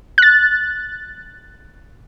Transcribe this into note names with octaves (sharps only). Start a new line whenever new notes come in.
F#6 A6